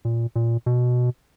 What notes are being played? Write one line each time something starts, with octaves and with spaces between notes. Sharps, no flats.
A#2
A#2
B2